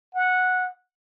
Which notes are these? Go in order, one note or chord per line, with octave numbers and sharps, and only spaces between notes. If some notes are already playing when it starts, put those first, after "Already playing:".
F#5